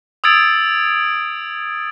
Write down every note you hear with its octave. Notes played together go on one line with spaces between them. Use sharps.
D#6 E6 G#6 A6 D7